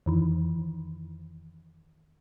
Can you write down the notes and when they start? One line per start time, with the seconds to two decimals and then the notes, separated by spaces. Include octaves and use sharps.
0.06 F2 D#3 E3